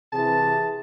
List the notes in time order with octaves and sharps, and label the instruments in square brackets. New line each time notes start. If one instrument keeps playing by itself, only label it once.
[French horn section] C3 E3 [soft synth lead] G#4 [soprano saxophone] A5